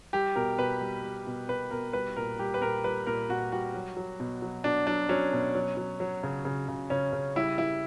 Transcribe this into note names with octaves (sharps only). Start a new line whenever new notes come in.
G3 G4
B2 A#4
B2 B4
G3
G3
B2
B2 B4
B2 A#4
G3 B4
A#2 A#4
G3 G4
B4
A#2 A#4
G3 B4
A#2 A#4
A#2 F#4
G3 F#4
F#3
F#3
B2
F#3
B2 D4
F#3 D4
F#3 C#4
B2
F#3
F#3
F#3
C#3
C#3
C#3
C#3 C#4
C#3
G3 E4
G3 E4